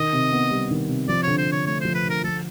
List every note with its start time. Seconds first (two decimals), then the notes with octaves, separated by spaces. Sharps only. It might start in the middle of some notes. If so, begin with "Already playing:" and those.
Already playing: D#3 D#5
0.13 C3
0.32 B3
0.51 G3
0.71 D#3
0.89 C3
1.08 F3 D5
1.23 D3 C#5
1.38 C5
1.48 D3 C#5
1.66 A3 C#5
1.81 F3 C5
1.95 B4
2.04 D3
2.10 A#4
2.23 F3 A4